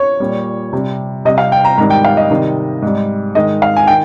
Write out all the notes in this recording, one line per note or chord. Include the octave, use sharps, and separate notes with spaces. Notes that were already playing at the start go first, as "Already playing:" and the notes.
Already playing: C#5
A#2 G3
C3 G3
C3 G3 D#5
F5
G5
A#5
G#2 D#3 G3 A#5
G5
F5
D#5
C3 D#3 G3
G#2 G3
G#2 D#3 G#3 D#5
F5
G#5
D#3 G5